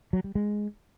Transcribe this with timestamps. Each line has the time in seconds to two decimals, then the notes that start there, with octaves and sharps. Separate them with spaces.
0.13 F#3
0.24 G3
0.35 G#3